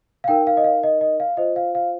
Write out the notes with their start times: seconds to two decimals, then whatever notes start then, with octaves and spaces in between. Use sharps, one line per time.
0.24 F5
0.28 D#4 A#4 G5
0.47 F5
0.57 D#5
0.64 F5
0.83 D#5
1.01 D#5
1.20 F5
1.37 F4 C5 D#5
1.56 F5
1.75 F5